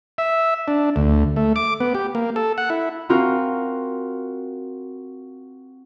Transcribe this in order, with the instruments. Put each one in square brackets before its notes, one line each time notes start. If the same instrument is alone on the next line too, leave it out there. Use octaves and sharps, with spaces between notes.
[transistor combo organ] E5
D4
D2
A3
D6
B3
G4
A#3
A4
F#5
E4
[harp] C4 F4 F#4 A#4